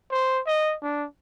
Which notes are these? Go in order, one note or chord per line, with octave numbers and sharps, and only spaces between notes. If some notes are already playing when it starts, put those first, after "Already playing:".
C5
D#5
D4